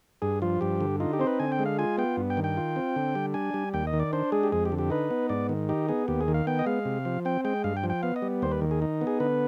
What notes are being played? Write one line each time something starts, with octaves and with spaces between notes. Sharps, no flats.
G2 G#4
F3 F4
G2 G4
D3
D#4 F4
G4
C4 C5
B4
D3 G#5
G5
G#3
F5
F4 G#5
B3 G5
G2
G5
D#3
G5
F4
C4
D3
G3
D4 G#5
G3
D#2 G5
D#5
D#3
D5
D4 C5
G#3 G#4
G4
F2 G#4
G4
D3
G4
D#4 B4
B3
G#2 D5
D#3
D#4 G4
B3 G#4
D#2 G4
G#4
D#3
F5
B3 G5
D#5
G#3 F5
C3
F3
C4 G5
G#3 G5
G2 F5
G5
F3
G5
B3 F5
D#5
G3
D#2 C5
B4
D#3
G#4
D#4
B3
G#4
D3 B4